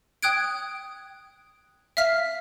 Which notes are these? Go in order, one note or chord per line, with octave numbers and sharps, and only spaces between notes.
G5 D#6 F#6 G#6 D7
E5 F5 F6 B6